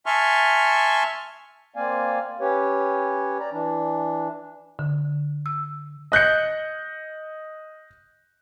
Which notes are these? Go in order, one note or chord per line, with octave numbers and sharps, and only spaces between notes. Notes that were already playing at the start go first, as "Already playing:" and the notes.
E5 G#5 A5 C6 C#6 F6
A#3 C4 D5 F5 G#5
C#4 G4 B4 C#5
D5 A#5
E3 D4
D3
E6
D#5 F#6 G6 C#7